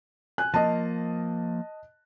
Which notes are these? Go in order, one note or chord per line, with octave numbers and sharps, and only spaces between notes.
G#5 F#6
F3 A#3 D#5 A5